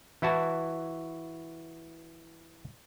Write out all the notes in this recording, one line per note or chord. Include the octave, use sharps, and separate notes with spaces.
E3 E4 F#4 A5